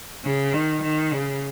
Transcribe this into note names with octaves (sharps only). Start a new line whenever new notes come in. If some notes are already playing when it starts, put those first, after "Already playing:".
C#3
D#3
D#3
C#3